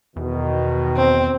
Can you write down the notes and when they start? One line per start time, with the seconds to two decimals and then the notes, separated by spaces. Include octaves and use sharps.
0.16 E2 B2 D#3
0.97 C4